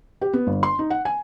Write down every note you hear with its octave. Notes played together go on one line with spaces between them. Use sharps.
G4
B3
G1
C6
D#4
F#5
G#5